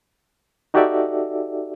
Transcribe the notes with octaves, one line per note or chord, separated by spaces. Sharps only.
D#4 F#4 G4 A4 D5 E5